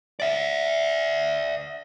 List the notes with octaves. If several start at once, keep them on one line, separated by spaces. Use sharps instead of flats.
D5 E5